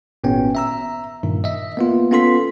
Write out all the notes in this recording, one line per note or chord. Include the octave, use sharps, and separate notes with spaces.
G#1 A#2 B3 C#4 G5
E5 A#5 E6
G2 A#2 D#3
D#5 E5
A#3 B3 F4
B3 C#4 F4 A4 C6 B6